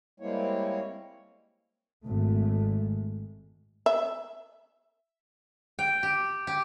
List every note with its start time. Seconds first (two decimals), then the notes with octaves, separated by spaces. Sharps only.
0.20 G3 G#3 A#3 C4 E4 C#5
2.04 G#1 G#3 A3
3.86 E5
5.79 G5
6.03 G4
6.47 G4